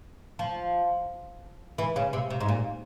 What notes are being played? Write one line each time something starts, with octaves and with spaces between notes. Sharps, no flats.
F3
E3
C#3
C3
C3
G#2
A#2